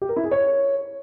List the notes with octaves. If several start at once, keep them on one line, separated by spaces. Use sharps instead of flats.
G4
A#4
E4
G#4
C#5